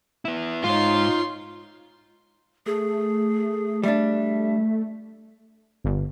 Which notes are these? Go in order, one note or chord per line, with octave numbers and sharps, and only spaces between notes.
B3 E4
G#2 D#4 F4 C#5 C6
A3 G#4
G3 D4 E5
G1